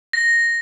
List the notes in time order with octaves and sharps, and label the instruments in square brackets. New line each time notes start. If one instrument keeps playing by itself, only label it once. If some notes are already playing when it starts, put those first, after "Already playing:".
[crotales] A#6